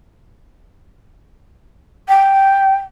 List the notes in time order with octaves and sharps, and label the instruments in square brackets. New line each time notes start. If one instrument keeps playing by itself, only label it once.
[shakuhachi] G5